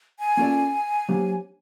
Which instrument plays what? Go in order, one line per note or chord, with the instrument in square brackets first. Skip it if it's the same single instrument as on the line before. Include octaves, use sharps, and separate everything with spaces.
[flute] G#5
[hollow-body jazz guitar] A#3 C#4 F4 A4 D5
F#3 A#3 D4 G4 C5